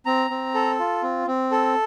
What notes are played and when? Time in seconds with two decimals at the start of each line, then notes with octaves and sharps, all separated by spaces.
0.06 C4 A#5
0.30 C4
0.55 A4
0.79 F4
1.03 C4
1.27 C4
1.51 A4